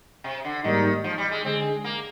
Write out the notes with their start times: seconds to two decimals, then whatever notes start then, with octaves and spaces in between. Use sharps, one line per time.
0.24 C3
0.45 D3
0.64 G#2 D#3 G3 A#3 D#4
1.04 F3
1.18 G3
1.31 G#3
1.45 D3 G#3 C4 D4 G#4
1.84 A#3